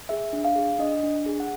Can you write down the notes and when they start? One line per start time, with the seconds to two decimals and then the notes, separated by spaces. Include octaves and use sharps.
0.09 G#4 E5
0.33 D4
0.44 F5
0.56 G#4
0.79 D4 D#5
1.03 D4
1.26 G#4
1.40 F#5